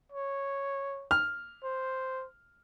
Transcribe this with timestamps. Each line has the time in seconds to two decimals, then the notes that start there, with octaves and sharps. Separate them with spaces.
0.12 C#5
1.11 F6
1.64 C5